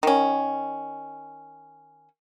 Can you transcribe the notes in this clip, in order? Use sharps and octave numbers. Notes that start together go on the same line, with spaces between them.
D#3 C#4